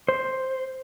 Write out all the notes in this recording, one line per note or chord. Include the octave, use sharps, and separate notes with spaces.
C5